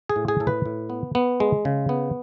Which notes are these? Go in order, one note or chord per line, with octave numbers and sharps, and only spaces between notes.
G#4
A2
G#4
A2 A4
B4
A2
B3
B3
G#3
C#3
B3